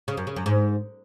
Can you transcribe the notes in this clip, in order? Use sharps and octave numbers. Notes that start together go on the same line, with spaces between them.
C#3
F#2
C#3
F#2
G#2